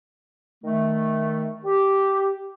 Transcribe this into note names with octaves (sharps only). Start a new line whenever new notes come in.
D#3 A3
G4